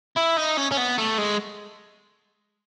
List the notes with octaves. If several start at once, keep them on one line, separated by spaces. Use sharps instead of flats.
E4
D#4
C#4
C#4
B3
A3
G#3